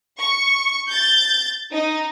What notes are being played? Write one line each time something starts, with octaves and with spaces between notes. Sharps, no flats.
C#6
G6 A6
D#4